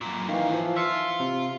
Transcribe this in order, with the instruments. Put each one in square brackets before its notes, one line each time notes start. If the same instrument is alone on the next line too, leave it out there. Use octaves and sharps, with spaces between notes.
[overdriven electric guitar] F#2 A#2
[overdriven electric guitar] G#2 F5 [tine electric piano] D#3 E3
[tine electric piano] E3 F3
[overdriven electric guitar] F4 [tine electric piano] E5 F5 C#7
[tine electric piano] C3